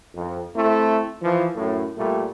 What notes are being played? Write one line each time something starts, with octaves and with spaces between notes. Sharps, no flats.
F2
A3 C4 E4
E3 F3
F#2 A2
A#2 G3 A3